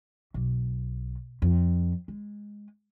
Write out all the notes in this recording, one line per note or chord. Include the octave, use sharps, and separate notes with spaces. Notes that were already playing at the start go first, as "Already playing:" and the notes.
B1
F2
G#3